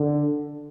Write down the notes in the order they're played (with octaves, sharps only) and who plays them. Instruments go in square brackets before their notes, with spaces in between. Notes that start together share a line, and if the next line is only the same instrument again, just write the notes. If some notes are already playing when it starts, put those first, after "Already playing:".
Already playing: [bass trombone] D3